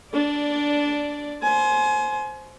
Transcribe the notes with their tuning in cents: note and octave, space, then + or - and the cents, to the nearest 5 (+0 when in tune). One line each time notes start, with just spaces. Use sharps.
D4 -10 D5 +0
C5 +0 G#5 +30